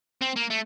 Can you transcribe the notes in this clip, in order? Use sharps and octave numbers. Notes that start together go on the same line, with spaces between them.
C4
A#3
A3